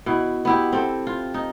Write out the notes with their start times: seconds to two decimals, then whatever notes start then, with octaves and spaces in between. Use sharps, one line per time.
0.06 B2 E4
0.45 B3 E4 G4
0.73 C4 A4
1.07 F4
1.34 D#4